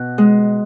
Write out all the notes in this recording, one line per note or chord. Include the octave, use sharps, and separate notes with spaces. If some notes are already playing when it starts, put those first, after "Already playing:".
Already playing: B2 F#5
G#3